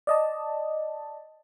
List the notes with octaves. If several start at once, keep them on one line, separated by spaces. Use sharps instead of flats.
D5 D#5 A5